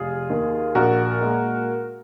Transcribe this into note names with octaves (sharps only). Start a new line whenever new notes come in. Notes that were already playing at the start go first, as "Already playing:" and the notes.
Already playing: F1 F4 G#4
D#2 D#3
A#1 F#4 A#4
A#2 G#3